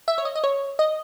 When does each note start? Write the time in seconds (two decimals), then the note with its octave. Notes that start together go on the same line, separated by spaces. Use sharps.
0.08 E5
0.18 C#5
0.25 D#5
0.35 D#5
0.44 C#5
0.79 D#5